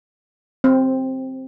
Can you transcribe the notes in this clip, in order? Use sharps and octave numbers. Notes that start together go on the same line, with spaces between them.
C4